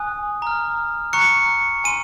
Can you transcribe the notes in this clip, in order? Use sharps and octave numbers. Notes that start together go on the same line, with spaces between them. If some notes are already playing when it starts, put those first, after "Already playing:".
Already playing: G#5 D#6 F#6
A#5 F6
A#5 C#6 F#6 C#7
G#5 C6 D#7